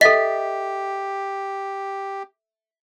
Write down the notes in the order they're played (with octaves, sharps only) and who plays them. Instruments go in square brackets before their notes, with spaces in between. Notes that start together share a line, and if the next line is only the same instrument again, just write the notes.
[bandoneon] G4 [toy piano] A4 D#5 [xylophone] E5 B6